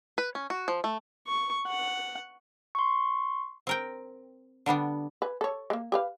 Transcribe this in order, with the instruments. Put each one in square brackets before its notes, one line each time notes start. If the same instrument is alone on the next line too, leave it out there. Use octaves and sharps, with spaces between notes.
[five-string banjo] B4
C#4
F#4
F3
A3
[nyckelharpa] C#6
F#5
[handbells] C6 C#6
[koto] C4 A#4 G5
D3 G3 B3 D4
[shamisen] B4 G#5
A4 C#5
G#3 A#3
G4 B4 F5